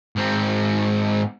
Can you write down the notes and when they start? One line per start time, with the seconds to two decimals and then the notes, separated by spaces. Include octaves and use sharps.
0.16 G#2 C4